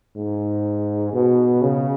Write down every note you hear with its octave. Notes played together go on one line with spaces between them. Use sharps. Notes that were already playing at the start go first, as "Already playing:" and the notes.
G#2
B2
C#3